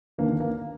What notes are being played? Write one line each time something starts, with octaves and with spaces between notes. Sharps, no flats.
D#2 D3 A#3
A#3